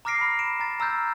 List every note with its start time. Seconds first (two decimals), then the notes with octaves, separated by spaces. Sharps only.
0.05 A#5 D6 F6 A#6 C7 D7
0.21 B5
0.39 D7 E7
0.60 A#5 A6
0.80 A#5 E6 F6 G6 A6